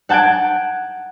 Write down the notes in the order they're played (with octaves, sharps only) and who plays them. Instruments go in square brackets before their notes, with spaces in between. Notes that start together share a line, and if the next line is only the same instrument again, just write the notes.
[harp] F#5 A5 G6 G#6 D7